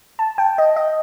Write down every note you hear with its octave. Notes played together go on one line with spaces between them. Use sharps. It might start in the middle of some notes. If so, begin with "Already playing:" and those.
A5
G5
D#5
D#5